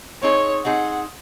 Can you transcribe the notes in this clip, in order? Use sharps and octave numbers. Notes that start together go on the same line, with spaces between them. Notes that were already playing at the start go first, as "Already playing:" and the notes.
C4 D#4 G#4 C#5
C4 D#4 G#4 F#5